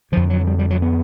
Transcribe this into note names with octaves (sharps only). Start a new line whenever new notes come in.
F2 D3 F3
F#3
G3
G3
F#3
B3